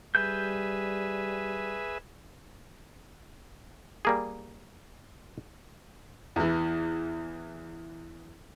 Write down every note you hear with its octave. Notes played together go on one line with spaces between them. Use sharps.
G3 G#4 B4 E5 G6
G3 A#3 G#4
E2 E3